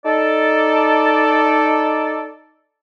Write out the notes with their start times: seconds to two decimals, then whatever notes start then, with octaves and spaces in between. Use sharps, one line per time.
0.05 D#4 A4 D5